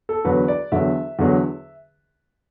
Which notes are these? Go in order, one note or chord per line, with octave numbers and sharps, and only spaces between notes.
A4
E2 D3 F#3 B4
D5
E2 D3 F#3 E5
E2 D3 F#3